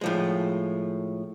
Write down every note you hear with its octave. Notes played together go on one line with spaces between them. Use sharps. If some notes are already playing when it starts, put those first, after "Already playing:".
A2 F3 G#3